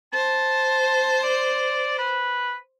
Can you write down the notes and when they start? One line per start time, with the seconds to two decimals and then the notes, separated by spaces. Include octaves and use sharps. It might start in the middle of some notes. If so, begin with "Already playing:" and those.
0.14 C5 A5
1.23 D5
1.98 B4